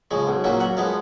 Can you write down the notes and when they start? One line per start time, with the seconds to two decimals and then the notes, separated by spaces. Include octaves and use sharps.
0.11 C#3 F3 G#3
0.27 B1
0.44 A#2 F#3 A#3 C#4
0.60 F#2 F#5
0.77 F3 G#3 B3 F5